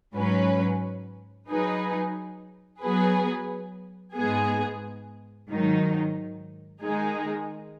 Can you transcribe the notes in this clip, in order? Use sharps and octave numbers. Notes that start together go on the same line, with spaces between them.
G#2 F#3 C#4 B4
F#3 D#4 G#4 B4
F#3 B3 G#4 B4
G#2 G#3 B3 G#4
G#2 D#3 F#3 D#4
D#3 G#3 D#4 G#4